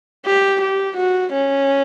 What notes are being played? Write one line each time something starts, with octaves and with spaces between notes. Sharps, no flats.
G4
G4
F#4
C#4